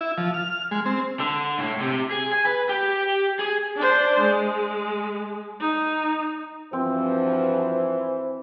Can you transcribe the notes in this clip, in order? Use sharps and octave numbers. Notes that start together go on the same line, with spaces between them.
E4
F3
F6
G#3
C4
D3
A2
C3
G#4
G#5
B4
G4
G#4
D4 C5
G#3
D#4
G2 E3 F3 C4 F#4 C5